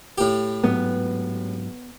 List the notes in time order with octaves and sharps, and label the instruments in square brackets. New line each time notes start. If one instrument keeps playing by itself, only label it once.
[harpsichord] A2 G4
[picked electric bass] G#2 F#3 [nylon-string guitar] B3